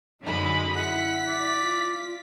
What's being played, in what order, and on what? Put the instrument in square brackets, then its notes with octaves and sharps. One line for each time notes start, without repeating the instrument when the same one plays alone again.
[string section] F#2 D3 G#3 [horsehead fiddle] D#4 B5
[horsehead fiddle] E4 [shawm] F#5 [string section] B6
[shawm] D5
[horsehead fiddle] F4